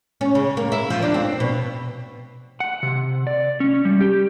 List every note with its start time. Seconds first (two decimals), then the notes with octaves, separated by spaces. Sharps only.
0.21 C#4
0.35 C#3
0.57 A#3
0.72 E4
0.90 F3
1.02 D4
1.14 C4
1.40 B2
2.60 F#5
2.83 C3
3.27 D5
3.60 C#4
3.85 G3
4.01 G4